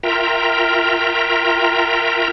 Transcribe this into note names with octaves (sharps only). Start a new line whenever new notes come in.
F4 A#4 E5 G5 A#5